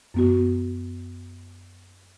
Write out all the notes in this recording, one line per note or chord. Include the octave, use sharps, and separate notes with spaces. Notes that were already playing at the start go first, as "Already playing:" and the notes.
F#2 B3 F#4